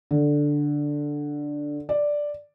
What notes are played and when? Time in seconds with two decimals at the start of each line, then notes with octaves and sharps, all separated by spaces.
0.11 D3
1.89 D5